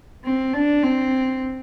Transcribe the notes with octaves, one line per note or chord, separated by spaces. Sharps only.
C4
D4
C4